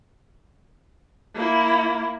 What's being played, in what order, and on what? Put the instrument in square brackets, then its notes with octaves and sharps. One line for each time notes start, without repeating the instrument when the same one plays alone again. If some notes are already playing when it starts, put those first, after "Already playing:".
[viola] A#3 E4